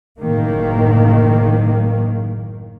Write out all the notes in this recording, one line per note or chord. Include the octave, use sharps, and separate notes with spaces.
F#1 A2 D#3 A#3